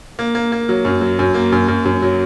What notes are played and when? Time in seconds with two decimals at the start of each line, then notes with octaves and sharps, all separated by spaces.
0.19 A#3
0.35 A#3
0.52 A#3
0.69 F#3
0.85 F#2
1.01 F#3
1.19 F#2
1.34 A#3
1.52 F#2
1.68 F#2
1.85 F#2
2.02 F#3